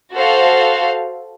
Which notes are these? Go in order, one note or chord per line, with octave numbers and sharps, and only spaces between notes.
F#4 A4 C5 F5